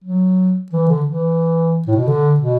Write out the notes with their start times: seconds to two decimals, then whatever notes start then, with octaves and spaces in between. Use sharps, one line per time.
0.04 F#3
0.72 E3
0.89 D3
1.06 E3
1.87 A2
1.96 B2
2.07 D3
2.40 B2